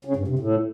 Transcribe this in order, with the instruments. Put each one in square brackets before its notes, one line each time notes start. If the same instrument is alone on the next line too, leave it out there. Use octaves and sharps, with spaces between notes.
[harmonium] C#3
G2
C3
A2